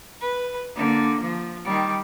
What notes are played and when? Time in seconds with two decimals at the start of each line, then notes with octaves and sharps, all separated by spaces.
0.21 B4
0.75 D3 A#3
1.21 F3
1.65 D#3 G3